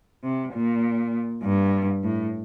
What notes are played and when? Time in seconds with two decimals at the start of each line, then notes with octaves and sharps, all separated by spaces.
0.24 C3
0.53 A#2
1.43 G2
2.03 A2